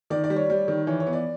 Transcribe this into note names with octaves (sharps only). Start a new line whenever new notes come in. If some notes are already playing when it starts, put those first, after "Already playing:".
D#3 D5
D5
G3
C#5
G3
D#3
E3 C#5
C#5
B3
D5